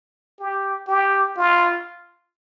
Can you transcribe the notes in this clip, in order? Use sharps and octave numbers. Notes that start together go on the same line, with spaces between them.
G4
G4
F4